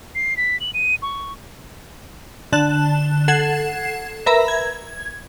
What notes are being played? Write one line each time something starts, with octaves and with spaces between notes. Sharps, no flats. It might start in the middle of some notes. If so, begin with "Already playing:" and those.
C7
B6
F#7
D#7
C#6
D3 A5 F#6 E7
A4 F#5 G#6 C7 E7
A#4 B4 E5 A#5 B5
G#6